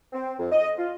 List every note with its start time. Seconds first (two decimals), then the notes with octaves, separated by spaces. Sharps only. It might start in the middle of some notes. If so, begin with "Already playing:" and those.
0.13 C4
0.39 F2
0.52 D#5
0.77 F4